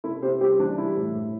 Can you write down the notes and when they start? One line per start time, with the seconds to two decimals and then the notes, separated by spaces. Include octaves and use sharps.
0.04 C3 E4 A4
0.22 C3 G4 C5
0.41 G3 G4 C5
0.59 E3 D4
0.78 G3 E4
0.96 A2
1.15 A2